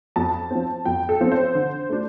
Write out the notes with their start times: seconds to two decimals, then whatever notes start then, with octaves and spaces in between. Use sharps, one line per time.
0.16 F2 A5
0.51 F3 C4
0.85 F2 G5
1.09 A4
1.20 F3 C4
1.32 C5
1.55 D3
1.89 A3 D4